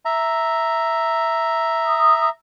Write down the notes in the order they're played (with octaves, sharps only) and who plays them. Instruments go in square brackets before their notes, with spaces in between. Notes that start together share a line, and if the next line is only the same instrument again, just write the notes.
[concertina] E5 A#5
[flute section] D#6